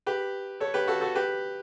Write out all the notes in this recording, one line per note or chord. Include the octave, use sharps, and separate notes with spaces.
G4 B4
A4 C#5
G4 B4
F#4 A4
F#4 A4
G4 B4